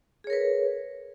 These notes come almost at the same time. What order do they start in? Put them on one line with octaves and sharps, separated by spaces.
G#4 C#5 A#4 B4